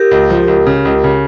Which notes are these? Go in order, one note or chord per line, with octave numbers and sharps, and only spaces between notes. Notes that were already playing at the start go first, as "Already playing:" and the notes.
Already playing: G4 A#4
C#2
F3
C#2
C#3
C#2
C#3